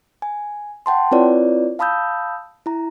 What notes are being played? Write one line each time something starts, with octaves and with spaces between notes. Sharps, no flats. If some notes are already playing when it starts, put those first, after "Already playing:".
G#5
F#5 G5 A5 C6
C4 E4 F4 B4 C#5 D5
F5 A5 B5 D#6 E6 G6
E4 A#5